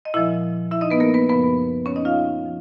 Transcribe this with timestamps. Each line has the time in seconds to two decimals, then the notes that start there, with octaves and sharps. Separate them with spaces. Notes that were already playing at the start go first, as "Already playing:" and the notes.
0.05 D#5
0.14 A#2 F3 G#3 E4 E5
0.71 E4 E5
0.81 D#4 D#5
0.90 B3 B4
1.00 A#3 A#4
1.14 B3 B4
1.29 F#2 C#3 F3 A#3 B3 B4
1.86 C#4 C#5
1.96 D#4 D#5
2.05 F4 F5
2.45 F3